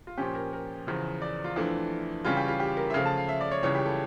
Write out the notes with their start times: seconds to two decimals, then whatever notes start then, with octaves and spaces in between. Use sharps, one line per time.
0.07 F4
0.17 A#2 F3 C#4 G4
0.35 A#4
0.53 A#4
0.87 E2 C#3 F3
1.22 D5
1.44 F4
1.56 F2 E3 A3 D4
2.25 C#3 E3 G3 C#4 F4
2.37 G4
2.48 F4
2.60 G4
2.77 A#4
2.90 E5
2.94 C#3 F3 A3 F5
3.06 A5
3.17 F5
3.28 E5
3.41 D5
3.51 C#5
3.63 C#2 C#3 E3 G3 C#5
3.75 G4
3.86 A4